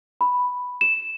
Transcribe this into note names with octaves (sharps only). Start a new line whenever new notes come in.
B5
E7